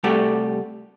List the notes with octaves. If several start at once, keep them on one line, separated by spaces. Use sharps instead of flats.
C2 G3 A3 F#4 G4 A4